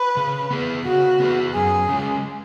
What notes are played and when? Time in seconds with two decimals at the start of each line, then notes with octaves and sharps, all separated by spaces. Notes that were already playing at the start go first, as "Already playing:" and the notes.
Already playing: B4
0.17 C#3
0.51 B3 G#4 B4
0.85 C#3 F#4
1.20 B3 G#4 B4
1.55 F#2 G#4
1.89 C#3 G#3